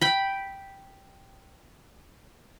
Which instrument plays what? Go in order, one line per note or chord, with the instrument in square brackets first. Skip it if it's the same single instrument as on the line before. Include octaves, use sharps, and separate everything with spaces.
[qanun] G5 B5